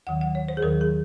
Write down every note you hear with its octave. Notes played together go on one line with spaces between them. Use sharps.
D#2 D#3 F#3 F#5
F#5
C#5
C5
G#4
D#2 D#3 F#3 A#4
G#4